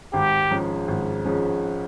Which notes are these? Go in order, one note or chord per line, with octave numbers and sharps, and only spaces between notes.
G#1 G4
G#2 F3 G#3 C#4
G#1
G#2 F3 G#3 C#4